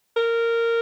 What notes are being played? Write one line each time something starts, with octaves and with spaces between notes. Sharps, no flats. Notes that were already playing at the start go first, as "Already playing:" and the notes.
A#4